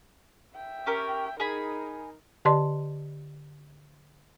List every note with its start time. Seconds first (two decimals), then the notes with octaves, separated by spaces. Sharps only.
0.56 E5 G5
0.86 C#4 G4 A#4
1.40 D#4 G#4 A#4 B5
2.45 D3 G4 D5 D#5 A5 C6